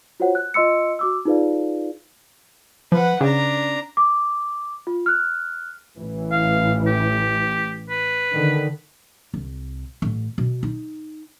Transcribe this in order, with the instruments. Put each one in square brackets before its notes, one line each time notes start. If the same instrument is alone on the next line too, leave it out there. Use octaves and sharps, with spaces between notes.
[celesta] F4 F#4 C5 C#5 F#5
F#6
F4 D#5 C6 E6 C#7
F#4 D6 E6
D#4 F4 G#4 B4 D5 F5
[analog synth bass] F3 [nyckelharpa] B4 F#5
[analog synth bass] C#3 [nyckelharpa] D4 A#5
[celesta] D6
F4
F6 F#6
[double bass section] A1 E3
[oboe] F5
G4
B4
[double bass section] D3 D#3
[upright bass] C2
A1
B2
D#4